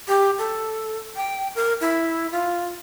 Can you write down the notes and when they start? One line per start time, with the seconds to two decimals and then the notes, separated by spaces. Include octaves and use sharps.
0.08 G4
0.38 A4
1.16 G5
1.55 A#4
1.81 E4
2.32 F4